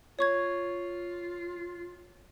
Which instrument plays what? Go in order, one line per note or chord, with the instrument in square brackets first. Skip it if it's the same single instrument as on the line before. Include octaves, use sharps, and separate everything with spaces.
[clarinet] F4 [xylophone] C#5 C#6 G#6